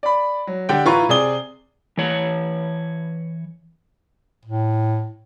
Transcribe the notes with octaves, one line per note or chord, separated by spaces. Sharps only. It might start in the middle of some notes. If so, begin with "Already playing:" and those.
D5 B5
F#3
D3 G4 F#5 G5
A2 E3 F4 B4 A#5 C#6
C3 G#4 D5 D#6 G7
E3 C#5
A2